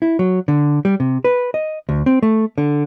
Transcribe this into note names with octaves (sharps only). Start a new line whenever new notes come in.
E4
F#3
D3
G3
C3
B4
D#5
D2
C4
A3
D3